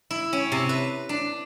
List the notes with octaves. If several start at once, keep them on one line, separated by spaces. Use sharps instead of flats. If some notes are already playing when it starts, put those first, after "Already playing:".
E4
C#4
C3
B4
D4